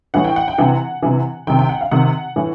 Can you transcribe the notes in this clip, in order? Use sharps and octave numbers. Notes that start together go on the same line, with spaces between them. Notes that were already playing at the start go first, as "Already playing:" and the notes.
A2 E3 F#5
G5
F#5
G5
C3 E3 F#5
C3 E3
C3 D#3 G5
G5
F#5
F5
C3 D#3 F#5
A2 E3